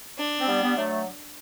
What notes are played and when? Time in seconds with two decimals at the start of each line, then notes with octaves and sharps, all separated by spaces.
0.18 D4
0.40 C4
0.46 G3 B3
0.61 G3 B3
0.75 F#3 A3